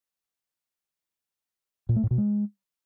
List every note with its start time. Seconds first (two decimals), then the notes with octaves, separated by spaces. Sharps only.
1.89 A#2
1.96 A3
2.03 A2
2.11 B2
2.18 G#3